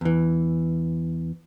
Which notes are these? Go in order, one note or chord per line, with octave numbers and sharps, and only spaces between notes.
E2 E3